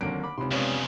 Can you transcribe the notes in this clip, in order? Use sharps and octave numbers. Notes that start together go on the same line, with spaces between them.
D#2 D3 F#3 A#3 C4 D4 D7
B5 D6
C#2 C3 D#4 B5 C6
F2 C#3 G#3 B3 C#4 D4 C#5